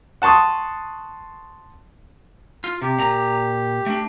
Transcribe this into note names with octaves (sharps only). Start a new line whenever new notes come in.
F#5 A5 C6 C#6 D#6
F4
C3 G4
A#2 A#5
A3 D4